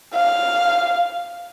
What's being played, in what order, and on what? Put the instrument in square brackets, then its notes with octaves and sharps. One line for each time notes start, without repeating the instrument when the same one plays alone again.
[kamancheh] F5